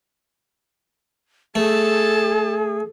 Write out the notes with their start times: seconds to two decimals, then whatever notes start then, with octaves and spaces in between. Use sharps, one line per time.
1.55 A3 G#4 A4 A5